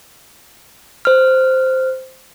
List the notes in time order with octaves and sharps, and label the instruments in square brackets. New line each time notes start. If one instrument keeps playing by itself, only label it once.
[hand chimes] C5 F6